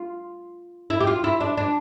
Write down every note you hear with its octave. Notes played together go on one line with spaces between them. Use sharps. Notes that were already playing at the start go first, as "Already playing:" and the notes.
Already playing: F4
E4
G4
F4
E4
D4
D4